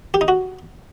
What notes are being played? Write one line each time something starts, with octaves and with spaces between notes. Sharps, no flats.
G4
D#4
F#4